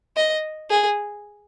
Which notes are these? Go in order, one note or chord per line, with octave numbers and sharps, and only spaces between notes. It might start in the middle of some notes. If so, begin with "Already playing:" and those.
D#5
G#4